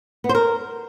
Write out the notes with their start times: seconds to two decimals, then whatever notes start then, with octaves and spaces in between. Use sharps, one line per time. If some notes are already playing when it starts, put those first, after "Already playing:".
0.24 B3
0.29 C5
0.35 A#4